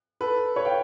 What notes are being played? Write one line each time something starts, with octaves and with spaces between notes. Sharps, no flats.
A4 B4
B4 C#5
F5 G5